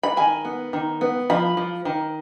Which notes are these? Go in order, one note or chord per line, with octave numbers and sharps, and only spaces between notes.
B5
D#3 G#5
B3
D#3
B3
F3 B5
F3
D#3